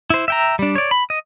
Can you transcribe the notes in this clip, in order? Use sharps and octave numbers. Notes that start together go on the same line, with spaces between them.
E4 C5
E5 G5 A#5
G3 D4
C#5 D5
B5
D#5